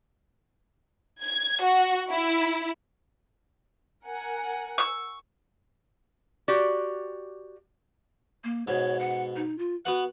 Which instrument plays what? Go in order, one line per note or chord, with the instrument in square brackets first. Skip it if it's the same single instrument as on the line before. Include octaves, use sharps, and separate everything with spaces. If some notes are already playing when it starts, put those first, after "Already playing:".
[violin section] G#6
F#4
E4
A#4 F#5 G#5
[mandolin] C#6 E6
[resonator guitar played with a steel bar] F#4 G4 D5
[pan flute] A#3
[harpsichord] G#2 B2 [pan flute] C#5
[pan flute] F#5
D#4
F4
[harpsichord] B3 F#4 F#5 [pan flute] B4